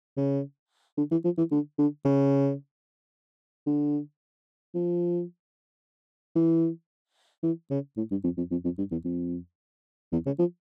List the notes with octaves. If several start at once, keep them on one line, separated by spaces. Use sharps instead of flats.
C#3
D3
E3
F3
E3
D3
D3
C#3
D3
F3
E3
E3
C#3
A2
G2
F2
F2
F2
F2
G2
E2
F2
E2
C#3
F3